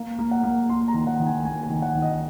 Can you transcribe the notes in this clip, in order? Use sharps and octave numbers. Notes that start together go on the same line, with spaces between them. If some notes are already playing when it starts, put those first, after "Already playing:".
Already playing: A#3 F5
A#3
F#5
A#3
A#3 C6
A#5
D#3
F#5
D#3
G#5
A#3 G#5
G#5
D#3
F#5
D#3
D#5